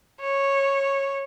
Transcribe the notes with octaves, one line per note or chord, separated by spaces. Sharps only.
C#5